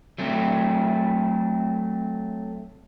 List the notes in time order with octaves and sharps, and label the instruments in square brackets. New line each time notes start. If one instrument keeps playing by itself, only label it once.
[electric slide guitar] F#3 A3 C4